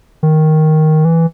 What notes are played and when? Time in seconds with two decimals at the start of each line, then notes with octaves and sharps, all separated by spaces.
0.23 D#3
1.05 E3